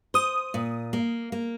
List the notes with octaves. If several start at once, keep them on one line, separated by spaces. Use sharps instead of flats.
C5 D#6
A#2
A#3
A#3